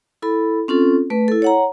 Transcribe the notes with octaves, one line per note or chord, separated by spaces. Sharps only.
E4 A4 B5
C4 C#4 F4 A4
A3 B4
E4 A4
C#5 F#5 A#5